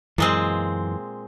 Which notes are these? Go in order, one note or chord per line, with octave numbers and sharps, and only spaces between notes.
F#2 A#2 E3 G#3 C4